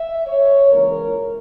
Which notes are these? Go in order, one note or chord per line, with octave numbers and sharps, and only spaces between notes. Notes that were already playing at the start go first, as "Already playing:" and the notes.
Already playing: E5
C#5
C#2 C#3 E3 A#3 A#4